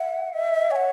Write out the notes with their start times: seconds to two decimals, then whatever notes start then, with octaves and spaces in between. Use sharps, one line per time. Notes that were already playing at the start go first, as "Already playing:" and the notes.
Already playing: E5 F#5
0.34 D#5 E5
0.53 D#5
0.71 C#5 G#5
0.76 F#5